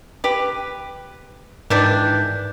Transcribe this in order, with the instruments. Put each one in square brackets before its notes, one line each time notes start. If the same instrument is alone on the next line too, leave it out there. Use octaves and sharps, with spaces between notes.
[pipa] G4 B4
[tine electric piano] G#2 G6 [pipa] D#3 E3 D4